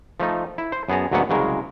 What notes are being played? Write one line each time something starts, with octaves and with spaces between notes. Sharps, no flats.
F3 A3 D#4
E4
C5
F#2 B3 G#4 A5 A#5
D2 G#2 F#3 A#3 B3 F#5
C2 C#3 F#3 G#3 A#4